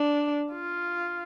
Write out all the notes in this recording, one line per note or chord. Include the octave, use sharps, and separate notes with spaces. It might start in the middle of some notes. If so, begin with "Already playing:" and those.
Already playing: D4
F4